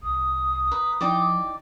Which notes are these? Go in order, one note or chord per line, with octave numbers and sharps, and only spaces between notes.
C2 D#6
B4 A#5
F3 D#4 E4 D5 G5 D6